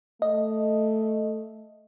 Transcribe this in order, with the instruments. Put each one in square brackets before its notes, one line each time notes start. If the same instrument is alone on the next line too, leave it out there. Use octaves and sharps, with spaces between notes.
[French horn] A3 [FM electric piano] D#5